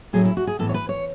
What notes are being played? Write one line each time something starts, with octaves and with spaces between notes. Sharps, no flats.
A2 F#3 A3 C#4 G#4
E4
F#4
G#4
A2 E3 B3 A4
C#5
B4
C#5